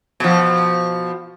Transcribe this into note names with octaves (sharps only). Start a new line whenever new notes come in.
B2 F3